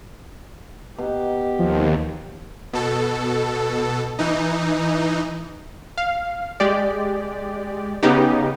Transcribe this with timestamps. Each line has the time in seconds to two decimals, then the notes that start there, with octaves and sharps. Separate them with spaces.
0.98 B2 D#4 G4
1.59 D#2 F3
2.73 B2 A4
4.19 E3 D#4
5.98 F5
6.60 G#3 G4 D5
8.03 C#3 B3 D#4 G4